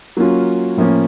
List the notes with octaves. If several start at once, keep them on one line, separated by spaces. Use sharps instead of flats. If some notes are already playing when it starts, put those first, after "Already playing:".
F#3 A#3 C#4 F4
A2 F3 A#3 C#4